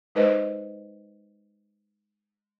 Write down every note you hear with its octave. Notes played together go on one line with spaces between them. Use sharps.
G#3 D#4 B4 C5 D#5